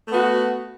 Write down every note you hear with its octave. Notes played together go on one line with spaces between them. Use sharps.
A3 B3 F#4